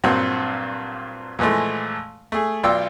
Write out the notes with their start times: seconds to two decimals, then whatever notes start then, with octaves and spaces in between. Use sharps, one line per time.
0.04 G2 A#2 F#3 C4 F#5
1.39 A#2 E3 F3 G#3 A3
2.32 A3 G#4
2.63 B1 F4 D5 G5 E6